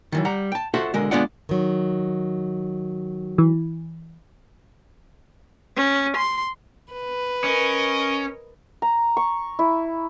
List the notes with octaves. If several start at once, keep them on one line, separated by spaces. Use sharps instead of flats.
D#3 E3 F#3
G3 F#5 A#5
G5 A5
F4 F#4 A4 C5 E5 F#5
B1 D3 G#3 A#4
G#3 B3 D4 F4 D5 F#5
D#3 F#3
E3
C#4
C6
B4
C#4 A#4 D#5
A#5
C#6
E4